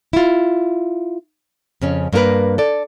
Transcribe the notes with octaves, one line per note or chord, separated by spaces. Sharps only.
E4 F4
F2 C#3 C#4
G2 A#3 D#4 A#4 B4
A4 D5